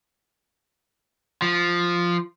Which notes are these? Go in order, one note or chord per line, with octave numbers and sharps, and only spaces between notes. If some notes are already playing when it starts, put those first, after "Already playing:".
F3